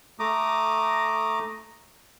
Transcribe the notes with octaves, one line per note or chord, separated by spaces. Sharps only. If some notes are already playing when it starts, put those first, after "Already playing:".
A3 A#5 D6 D#6